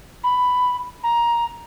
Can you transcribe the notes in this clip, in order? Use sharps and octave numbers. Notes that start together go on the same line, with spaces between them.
B5
A#5